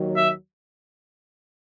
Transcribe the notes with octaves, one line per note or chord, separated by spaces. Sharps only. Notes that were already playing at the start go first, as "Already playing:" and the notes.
Already playing: D#2 D#3 F#3
E5